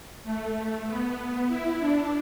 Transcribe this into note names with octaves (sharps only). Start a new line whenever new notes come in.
A3
A3
B3
E4
D4